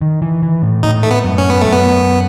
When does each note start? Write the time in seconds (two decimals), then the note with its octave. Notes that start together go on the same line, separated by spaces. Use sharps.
0.02 D#3
0.22 E3
0.42 E3
0.62 A2
0.83 A2 D#4
1.03 A3
1.11 B3
1.24 F#2
1.38 C#4
1.50 B3
1.61 F#2 A3
1.73 B3